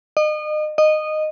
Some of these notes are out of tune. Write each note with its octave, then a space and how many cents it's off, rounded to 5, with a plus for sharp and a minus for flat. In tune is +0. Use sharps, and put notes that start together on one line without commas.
D#5 -35
D#5 -15